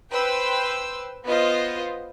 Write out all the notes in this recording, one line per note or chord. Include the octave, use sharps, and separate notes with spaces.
B4 C5 G5 E6
B3 F4 C5 D#5